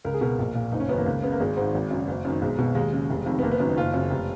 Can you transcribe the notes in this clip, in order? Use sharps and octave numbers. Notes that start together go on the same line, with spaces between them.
C#2 A#4
G#4
B2 A#4
A#1
A#2
F#1 D#4
C#4
F#2 D#3 B3
A#3
C#2
C#3 B3
A#3
G#1 G#3
G#2 D#3
G#1
F#2 C#3
F#1
F#2 D#3
B1 G#3
B2
D#2 G#3
C#3
F1
F2 D#3
B3
F#1 A#3
B3
F#2 D#3
D#4
F#1 F4
F#2 C#3
F1